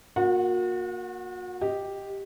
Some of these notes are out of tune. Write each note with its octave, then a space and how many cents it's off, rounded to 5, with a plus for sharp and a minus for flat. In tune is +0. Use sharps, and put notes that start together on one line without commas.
A#3 +0 F#4 -40 F#5 +0
G4 +0 D#5 +0